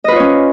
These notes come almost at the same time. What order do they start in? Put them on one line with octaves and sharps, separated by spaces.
D#5 B4 F4 C#5 C#4